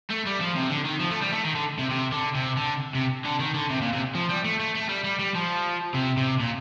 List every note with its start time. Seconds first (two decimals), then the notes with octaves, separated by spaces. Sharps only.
0.10 A3
0.26 G3
0.40 F3
0.56 C3
0.69 D3
0.85 D#3
1.00 F3
1.11 A3
1.22 G3
1.33 A3
1.44 D#3
1.55 D3
1.78 C3
1.90 C3
2.12 D3
2.35 C3
2.57 D3
2.95 C3
3.25 D3
3.40 D#3
3.54 D3
3.70 C3
3.81 A#2
3.93 C3
4.15 F3
4.29 G3
4.44 A3
4.59 A3
4.75 A3
4.89 G3
5.04 G3
5.19 G3
5.35 F3
5.94 C3
6.17 C3
6.40 A#2